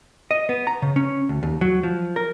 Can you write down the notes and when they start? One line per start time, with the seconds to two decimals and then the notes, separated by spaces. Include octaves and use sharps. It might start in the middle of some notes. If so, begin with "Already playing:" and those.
0.31 D#5
0.49 B3
0.67 A#5
0.82 C#3
0.96 C#4
1.29 D2
1.43 D#2
1.61 F#3
1.83 F3
2.16 A#4